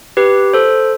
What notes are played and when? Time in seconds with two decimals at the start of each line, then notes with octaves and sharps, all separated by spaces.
0.17 G4 B4
0.54 A4 C5